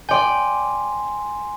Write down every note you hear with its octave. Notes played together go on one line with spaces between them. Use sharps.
D5 G5 G#5 C6